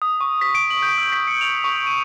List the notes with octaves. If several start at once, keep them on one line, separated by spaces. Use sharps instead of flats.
D#6
C#6
B6
D7
F#7
G6
E6
B6
C#7
F7
C#6
D#7